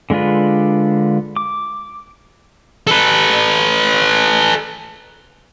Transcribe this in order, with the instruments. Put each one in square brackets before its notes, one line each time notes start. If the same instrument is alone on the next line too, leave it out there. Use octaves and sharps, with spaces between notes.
[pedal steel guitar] D3 G#3 D4 F4 B4
D6
[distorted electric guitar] A4 B4